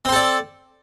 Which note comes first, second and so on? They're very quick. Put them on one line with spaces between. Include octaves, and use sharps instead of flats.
C4 C5 A4 D5